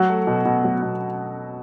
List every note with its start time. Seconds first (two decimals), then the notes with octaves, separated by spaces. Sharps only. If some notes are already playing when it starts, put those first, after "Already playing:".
Already playing: F#3 F#4
0.09 A3
0.27 B2
0.45 B2
0.64 F#3
0.82 B2